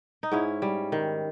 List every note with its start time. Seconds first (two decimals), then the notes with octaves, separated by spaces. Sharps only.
0.23 D#4
0.32 G#2 C#4 E4
0.62 G3
0.92 D#3